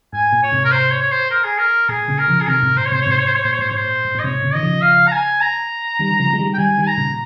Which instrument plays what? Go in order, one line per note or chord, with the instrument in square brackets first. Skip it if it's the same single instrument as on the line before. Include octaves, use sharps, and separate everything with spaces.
[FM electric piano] G#2 [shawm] G#5
[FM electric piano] A#2
[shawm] C#5
[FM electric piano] G#2 C3
[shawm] A#4
C5
C#5
C#5
C5
A#4
G#4
A#4
[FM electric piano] A#2 [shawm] G#4
[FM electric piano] A#2 C#3
[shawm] A#4
[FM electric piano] C#3 F3
[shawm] G#4
[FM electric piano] C3 D#3 [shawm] A#4
[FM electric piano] G#2 C3
[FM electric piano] A#2 [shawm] C5
[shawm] C#5
[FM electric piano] G#2 C3 [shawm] C5
[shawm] C#5
[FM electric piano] G#2 C3
[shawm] C5
C#5
[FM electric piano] G#2 [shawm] C5
[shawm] C#5
[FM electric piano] A#2 [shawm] C5
[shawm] C#5
[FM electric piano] G#2 [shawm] C5
[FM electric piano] A#2 [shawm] C#5
[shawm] C5
[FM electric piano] G#2
A#2
[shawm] D#5
[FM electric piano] G#2 C3 [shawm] C#5
[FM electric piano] A#2 C#3
[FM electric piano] D#3 [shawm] D#5
[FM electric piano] C#3 F3
[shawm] F5
A#5
G#5
A#5
[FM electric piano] D#3 G3
D#3
C#3 F3
G#3
D#3 G3
[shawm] G5
[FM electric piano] D#3 G3 [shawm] G#5
[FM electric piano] D#3 G3
[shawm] G#5
A#5
[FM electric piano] A#2 C#3